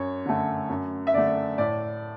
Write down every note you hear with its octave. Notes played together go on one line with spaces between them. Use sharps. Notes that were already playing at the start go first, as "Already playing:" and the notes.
Already playing: F#2 C#5
D3 A3
F#2
E5
D3 A3 D5
A2 D5